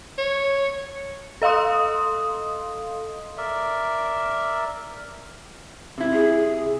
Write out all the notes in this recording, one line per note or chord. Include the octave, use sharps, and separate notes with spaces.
C#5
A4 D#5 F5 C6 D#6
A#4 D5 E5
C3 E4
G#4